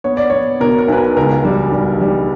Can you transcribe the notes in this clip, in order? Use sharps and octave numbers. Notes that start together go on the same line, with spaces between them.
B3 C#5
D5
B3 C#5
B2 A#4
A#4
B1 B4
A#4
C#2 A#4
G3
G3
G3